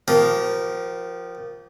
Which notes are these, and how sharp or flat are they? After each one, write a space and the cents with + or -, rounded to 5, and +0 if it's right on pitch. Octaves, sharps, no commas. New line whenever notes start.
F3 +0 G4 -30 A#4 +15